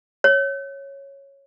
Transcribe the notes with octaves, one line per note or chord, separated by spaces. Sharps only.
C#5